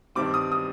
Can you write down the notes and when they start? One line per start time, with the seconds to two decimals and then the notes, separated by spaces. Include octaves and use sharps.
0.15 G2 D#3 G3 C4 D6
0.34 D#6
0.52 D#6